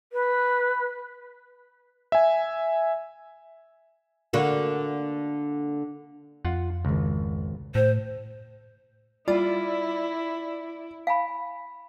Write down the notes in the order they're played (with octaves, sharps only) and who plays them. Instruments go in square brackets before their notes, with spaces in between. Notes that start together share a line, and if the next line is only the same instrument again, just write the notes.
[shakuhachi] B4
[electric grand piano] E5 G#5
[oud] D3 A#3 F#4
[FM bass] F2 [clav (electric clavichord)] F4 F#5
[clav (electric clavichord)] G#1 C#2
[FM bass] A2 [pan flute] C5
[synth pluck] G3 F4 [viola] E4 [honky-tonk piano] D5
[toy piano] F5 G#5 B5